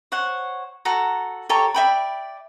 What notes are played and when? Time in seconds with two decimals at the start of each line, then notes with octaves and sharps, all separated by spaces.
0.12 C5 C#5 F#5
0.85 F#4 A4 A#5
1.49 G4 A4 C#5 A#5
1.74 D5 E5 G5 B5